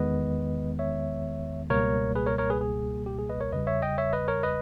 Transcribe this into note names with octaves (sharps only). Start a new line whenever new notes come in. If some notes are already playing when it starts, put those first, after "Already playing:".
Already playing: E2 D#3 G#3 B3 B4 D#5
C#5 E5
C#2 B2 G3 A#3 A#4 C#5
G#4 B4
A#4 C#5
A#4 C#5
G#4 B4
G#4
G4
G#4
B4 D#5
A#4 C#5
E2 C#3 G3 B4 D#5
C#5 E5
D#5 G5
C#5 E5
B4 D#5
A#4 C#5
B4 D#5